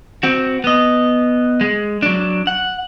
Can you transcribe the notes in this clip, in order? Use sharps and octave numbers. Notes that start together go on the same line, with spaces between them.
C4 F#4
B3 D#5
G#3
F#3 D4
F#5